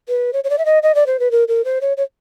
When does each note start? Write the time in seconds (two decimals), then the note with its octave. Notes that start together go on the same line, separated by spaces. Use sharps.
0.08 B4
0.33 C#5
0.44 C#5
0.50 D5
0.58 E5
0.65 D#5
0.83 D#5
0.95 D5
1.06 C5
1.19 B4
1.31 A#4
1.48 A#4
1.64 C5
1.81 C#5
1.97 C#5